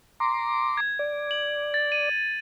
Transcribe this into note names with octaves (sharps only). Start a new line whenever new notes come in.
A#5 C6 D6
G#6
D5
F#7
A6
D#7